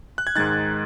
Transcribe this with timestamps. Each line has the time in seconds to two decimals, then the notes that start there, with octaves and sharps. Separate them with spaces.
0.18 F#6
0.27 G#6
0.36 G#2 D#3 G#3 D#4 F#6 A6